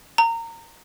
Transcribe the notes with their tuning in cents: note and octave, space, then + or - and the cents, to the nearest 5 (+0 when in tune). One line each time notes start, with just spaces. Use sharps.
A#5 -25